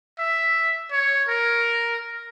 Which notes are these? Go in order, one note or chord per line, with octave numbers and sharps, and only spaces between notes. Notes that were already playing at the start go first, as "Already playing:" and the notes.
E5
C#5
A#4